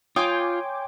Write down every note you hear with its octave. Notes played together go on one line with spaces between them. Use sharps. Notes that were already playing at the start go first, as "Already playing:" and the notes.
F4 C#5 G5 G#5 C6 D6 D#6 G#6